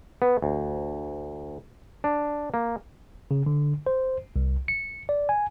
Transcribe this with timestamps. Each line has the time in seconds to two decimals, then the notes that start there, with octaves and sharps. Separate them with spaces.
0.22 B3
0.42 D2
2.04 D4
2.54 A#3
3.31 C#3
3.46 D3
3.86 C5
4.36 C2
4.68 C#7
5.09 D5
5.29 G#5